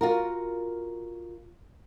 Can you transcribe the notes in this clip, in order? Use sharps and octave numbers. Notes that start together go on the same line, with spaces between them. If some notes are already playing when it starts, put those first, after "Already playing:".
F4 F#4 A#4